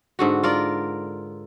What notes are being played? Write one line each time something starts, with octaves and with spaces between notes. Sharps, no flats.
G#2 D3 F#4
F4 A#4 D5